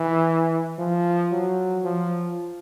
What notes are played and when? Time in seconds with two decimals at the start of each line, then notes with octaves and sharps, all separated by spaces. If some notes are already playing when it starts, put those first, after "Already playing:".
Already playing: E3
0.79 F3
1.31 F#3
1.84 F3